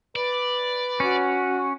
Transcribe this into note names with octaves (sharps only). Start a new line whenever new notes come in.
B4 D5
C#4 F#4